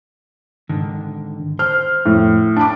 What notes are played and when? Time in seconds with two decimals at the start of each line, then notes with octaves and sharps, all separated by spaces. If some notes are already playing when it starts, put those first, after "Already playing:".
0.69 G#2 D3 D#3
1.59 C5 F6
2.05 F2 A2
2.56 D4 G5 A5 B5 D6